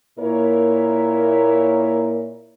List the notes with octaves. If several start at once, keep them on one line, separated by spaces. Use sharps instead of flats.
A#2 A#3 E4 A#4 C#5